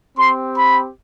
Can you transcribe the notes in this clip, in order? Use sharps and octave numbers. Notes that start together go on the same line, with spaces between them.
C4 G4 C6
B5